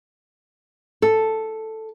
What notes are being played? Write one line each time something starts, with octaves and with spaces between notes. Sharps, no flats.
A4